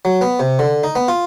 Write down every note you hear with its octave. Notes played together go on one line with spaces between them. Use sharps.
F#3
B3
C3
D3
D#4
B3
F4